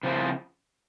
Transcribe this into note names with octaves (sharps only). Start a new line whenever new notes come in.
C#3 F3 C4 E4